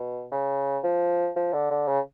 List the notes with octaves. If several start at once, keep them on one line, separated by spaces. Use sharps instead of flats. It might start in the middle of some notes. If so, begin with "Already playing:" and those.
Already playing: B2
C#3
F3
F3
D3
D3
C#3